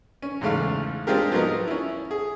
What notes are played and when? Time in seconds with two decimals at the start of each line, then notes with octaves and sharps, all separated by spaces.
0.22 C#4
0.41 E2 G#2 C#3 A3 F5
1.07 G#3 C4 D4 F4 G4 A#4
1.32 F3 F#3 B3 D#4 A#4
1.68 C#4 E4
2.11 G#4